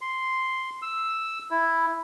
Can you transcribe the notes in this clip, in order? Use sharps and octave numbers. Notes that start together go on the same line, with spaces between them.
C6
E6
E4